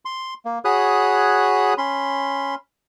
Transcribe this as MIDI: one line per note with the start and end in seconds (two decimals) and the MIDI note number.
0.05 0.34 84
0.45 0.59 58
0.65 1.74 66
0.65 1.74 68
0.65 1.74 73
0.65 1.74 83
0.65 1.74 87
0.65 1.74 90
1.78 2.55 61
1.78 2.55 83
1.78 2.55 84